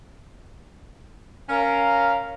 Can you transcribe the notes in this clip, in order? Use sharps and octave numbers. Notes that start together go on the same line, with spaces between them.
C#4 A#4 F5